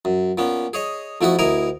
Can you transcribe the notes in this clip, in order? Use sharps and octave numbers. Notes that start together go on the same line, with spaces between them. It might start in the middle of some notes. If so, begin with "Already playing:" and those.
F#2
A#2 B3 C#4
G#4 C#5 D#5
F2 A3 E4 F#4 E5 D#6
D2 E4 A#4 D#5 G#5 A#5